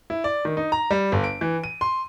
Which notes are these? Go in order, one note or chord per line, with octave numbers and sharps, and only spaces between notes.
E4
D5
D#3
D#4
A#5
G3
G1
D7
E3
D#7
C6